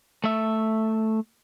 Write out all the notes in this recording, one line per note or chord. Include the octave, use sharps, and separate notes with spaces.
A3 E5